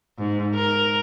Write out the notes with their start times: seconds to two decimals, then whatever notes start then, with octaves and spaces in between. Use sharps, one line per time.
0.18 G#2
0.54 A#4